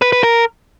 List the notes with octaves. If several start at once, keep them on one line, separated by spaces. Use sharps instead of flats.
B4
B4
A#4